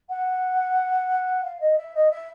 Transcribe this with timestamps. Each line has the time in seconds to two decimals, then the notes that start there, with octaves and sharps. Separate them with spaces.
0.09 F#5
1.44 F5
1.60 D#5
1.77 E5
1.95 D#5
2.10 E5